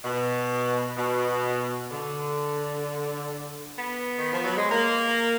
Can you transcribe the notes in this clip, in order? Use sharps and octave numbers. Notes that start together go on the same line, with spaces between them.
B2
B2
D3
B3
D#3
F3
F#3
G#3
A#3